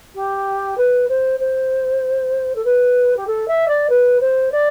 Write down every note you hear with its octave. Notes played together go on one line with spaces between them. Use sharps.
G4
B4
C5
C5
A4
B4
G4
A4
E5
D5
B4
C5
D5